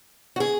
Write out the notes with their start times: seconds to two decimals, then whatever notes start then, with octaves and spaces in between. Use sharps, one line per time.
0.36 F#4
0.40 G#4